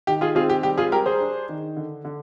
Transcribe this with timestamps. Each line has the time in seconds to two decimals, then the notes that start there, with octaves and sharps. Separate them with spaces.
0.07 D#3 G4
0.21 F4 G#4
0.35 C4 F4 G#4
0.49 G4
0.63 G3 G4
0.78 F4 G#4
0.92 G3 G4 A#4
1.06 G#4 C5
1.20 D4
1.49 D#3
1.77 D3
2.05 D3